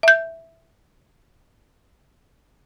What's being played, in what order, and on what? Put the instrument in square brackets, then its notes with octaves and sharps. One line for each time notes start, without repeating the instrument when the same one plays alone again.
[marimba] E5 G6